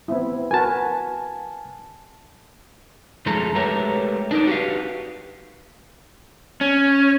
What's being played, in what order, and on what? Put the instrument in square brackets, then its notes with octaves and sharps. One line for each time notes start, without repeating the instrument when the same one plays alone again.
[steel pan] B3 C4 E4
[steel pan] F#4 A#4 B4 [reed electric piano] G#5 A5
[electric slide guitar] F#2 F3 G#3 A3 A4 A#5
G#3 A3 G4 A#4 B4 C#5
D4 D#4 A#4 D5
F#4 G4 B4 F5
C#4